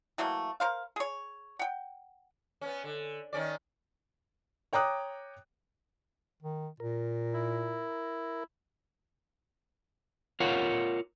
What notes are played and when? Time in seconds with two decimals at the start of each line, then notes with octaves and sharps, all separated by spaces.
0.18 E3 F#3 A3 A#3
0.60 A#4 C5 F5
0.96 G#4 C#5
1.59 F#5 G5
2.61 B3 C#4
2.84 D3
3.33 D#3 C#4 D5
4.73 C#5 G5 A#5 D6 D#6 F#6
6.42 D#3
6.80 A#2 A#4
7.34 E4
10.40 F4 A#4 C#5 F5 F#5